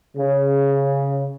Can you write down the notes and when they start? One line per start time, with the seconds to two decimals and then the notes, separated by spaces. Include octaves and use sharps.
0.16 C#3